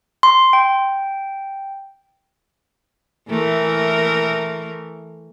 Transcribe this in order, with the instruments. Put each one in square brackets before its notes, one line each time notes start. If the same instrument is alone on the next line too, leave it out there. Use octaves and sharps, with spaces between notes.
[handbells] C6
G5
[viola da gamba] E3 A3 A#4